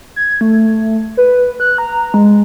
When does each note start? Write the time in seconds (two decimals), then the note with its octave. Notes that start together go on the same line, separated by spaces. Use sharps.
0.16 G#6
0.41 A3
1.17 B4
1.60 F#6
1.78 A#5
2.14 G#3